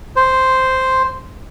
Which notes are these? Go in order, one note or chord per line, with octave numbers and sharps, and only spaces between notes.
C5